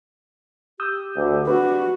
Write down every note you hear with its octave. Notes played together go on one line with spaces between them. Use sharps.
G4 D#6 E6 G6
D2
D4 F#4 B4